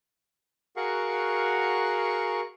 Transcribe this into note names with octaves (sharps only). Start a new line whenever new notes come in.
F#4 G#4 A#4 F5 F#5 C#6